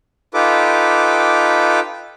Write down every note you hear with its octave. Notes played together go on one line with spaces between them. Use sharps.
D#4 F4 G4 A4 B4 D6